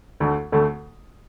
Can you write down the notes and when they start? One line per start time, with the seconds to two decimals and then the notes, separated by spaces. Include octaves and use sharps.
0.20 D2 D3 A3
0.52 D2 D3 A3